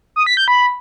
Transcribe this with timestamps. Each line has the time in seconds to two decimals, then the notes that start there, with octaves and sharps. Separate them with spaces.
0.16 D#6
0.27 B6
0.37 G6
0.48 B5